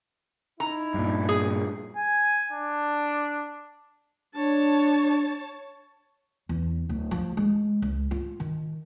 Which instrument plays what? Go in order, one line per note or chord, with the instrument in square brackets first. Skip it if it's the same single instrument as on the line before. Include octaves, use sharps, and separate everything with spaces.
[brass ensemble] D#4 E4 [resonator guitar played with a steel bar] A#5
[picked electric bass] G2 A#2
[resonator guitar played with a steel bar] G#4
[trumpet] G#5
D4
[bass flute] D4 [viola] C#5 A5
[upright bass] E2
D1
F3
G#3
C#2
F4
D#3